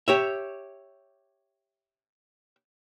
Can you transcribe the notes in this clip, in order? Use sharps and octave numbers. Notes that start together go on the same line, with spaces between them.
G4 C#5 E5